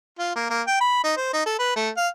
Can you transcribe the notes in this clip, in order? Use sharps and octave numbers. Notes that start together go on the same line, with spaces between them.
F4
A#3
A#3
G5
B5
D#4
C5
D#4
A4
B4
A3
F5